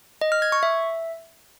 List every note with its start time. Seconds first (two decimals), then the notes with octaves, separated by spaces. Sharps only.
0.21 D#5
0.32 F6
0.42 G#6
0.52 C#6
0.63 E5